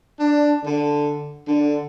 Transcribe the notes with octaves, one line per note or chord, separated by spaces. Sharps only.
D4
D3
D3